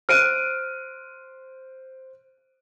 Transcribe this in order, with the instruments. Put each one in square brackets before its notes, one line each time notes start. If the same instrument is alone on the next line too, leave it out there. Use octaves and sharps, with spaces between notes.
[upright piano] C5 D7 D#7 [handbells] F6 F#6